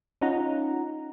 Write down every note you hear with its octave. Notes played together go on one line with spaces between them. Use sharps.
C#4 D#4 F4 F#5 A#5